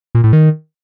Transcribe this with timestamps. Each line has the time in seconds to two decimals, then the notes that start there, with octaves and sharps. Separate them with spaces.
0.15 A#2
0.24 A2
0.33 D#3